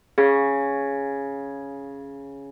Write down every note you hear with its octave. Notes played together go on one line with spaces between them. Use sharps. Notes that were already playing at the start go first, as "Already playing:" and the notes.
C#3 G#4